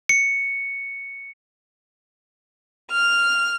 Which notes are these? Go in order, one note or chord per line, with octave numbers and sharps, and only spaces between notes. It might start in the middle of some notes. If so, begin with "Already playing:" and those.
C#7
F6